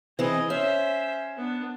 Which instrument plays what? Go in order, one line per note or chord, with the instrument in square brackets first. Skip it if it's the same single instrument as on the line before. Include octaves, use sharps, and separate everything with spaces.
[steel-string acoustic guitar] E3 C4 [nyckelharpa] G#4 D#5
[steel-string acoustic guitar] C#4 [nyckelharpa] C5 E5
[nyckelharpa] B3 D4